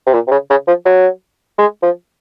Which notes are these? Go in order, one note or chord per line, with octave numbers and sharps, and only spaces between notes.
C3
A#2
C3
C#3
C#3
F3
F#3
G#3
F3